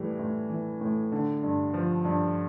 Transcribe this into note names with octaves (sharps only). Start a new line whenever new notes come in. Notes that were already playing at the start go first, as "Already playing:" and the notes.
Already playing: A2 E3 G3
A2
E3
A2
D3
G2
F3
G2